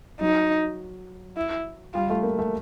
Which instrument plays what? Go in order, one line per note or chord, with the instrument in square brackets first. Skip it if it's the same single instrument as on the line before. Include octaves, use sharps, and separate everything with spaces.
[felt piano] F#3 [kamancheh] D#4
[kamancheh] E4
[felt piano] G3 [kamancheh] F4
[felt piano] A3
A#3
A3